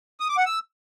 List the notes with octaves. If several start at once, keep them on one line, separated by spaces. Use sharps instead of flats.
D#6
D6
F#5
E6